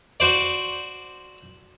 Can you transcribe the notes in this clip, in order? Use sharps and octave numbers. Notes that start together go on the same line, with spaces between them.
F#4 C5 D5